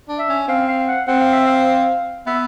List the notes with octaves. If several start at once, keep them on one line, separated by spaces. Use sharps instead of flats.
D4
E5
C#4
C4 F5
F5
F#5
C4 F#5
F5
E5
F5
B3 E5